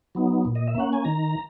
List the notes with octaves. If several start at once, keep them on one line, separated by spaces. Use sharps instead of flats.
F#3 B3 D#4
A#2
D#5
E5
A#3 C#4 F#5
G#5
D#3 A#5